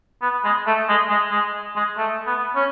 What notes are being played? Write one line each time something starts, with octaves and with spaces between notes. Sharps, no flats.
B3
G#3
A3
G#3
G#3
G#3
G#3
A3
B3
C#4